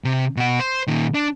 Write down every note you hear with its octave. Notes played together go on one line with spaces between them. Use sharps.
C3
B2 F#5
C5 C6
A#2 D#3
D4